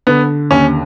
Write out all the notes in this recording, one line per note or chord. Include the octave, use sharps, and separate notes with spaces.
D3 B3
D#2 C#4